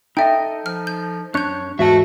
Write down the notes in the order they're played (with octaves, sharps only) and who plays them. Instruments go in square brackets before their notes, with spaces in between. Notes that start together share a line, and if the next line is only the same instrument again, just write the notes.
[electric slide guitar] D#4 A4 D#5 [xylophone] E5 G5
[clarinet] F3 [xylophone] F6
[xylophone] G6
[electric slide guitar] F#2 C#4 C#5 [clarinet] D4 [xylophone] F#6 G6
[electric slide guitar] E2 G#2 [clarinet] F#4 [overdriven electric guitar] E5 A5